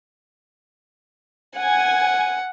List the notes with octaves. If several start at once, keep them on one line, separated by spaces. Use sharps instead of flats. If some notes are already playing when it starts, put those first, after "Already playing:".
F#5 G#5